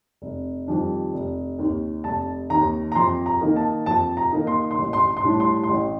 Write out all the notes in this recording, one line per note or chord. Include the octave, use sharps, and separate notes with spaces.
F1
F2 D#3 G3 D4
F1
D#2 D#3
F1 A5
D#2 D#3 A#5
A#5
F2 C6
A#5
D#3 A#3 D#4
A5
F2 A5
A#5
D#3 A#3 D#4
C6
C6
A1
C6
C6
A2 G3 D4
C6
C6
A1